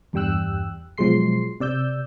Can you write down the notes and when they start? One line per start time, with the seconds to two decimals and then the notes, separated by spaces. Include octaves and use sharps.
0.13 E2 G2 G3 G5 E6 F#6
0.98 B2 F3 F#3 G#3 C6 C7
1.60 C3 D5 E6 G6